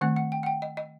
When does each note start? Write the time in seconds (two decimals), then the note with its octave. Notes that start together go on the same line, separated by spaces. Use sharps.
0.01 D#3 A3 C4 F#5
0.16 F#5
0.32 G5
0.43 F#5
0.46 G5
0.62 D#5
0.77 D#5